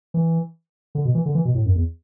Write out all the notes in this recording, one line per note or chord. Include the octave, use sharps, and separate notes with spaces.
E3
D3
B2
E3
D3
E3
B2
A2
F#2
E2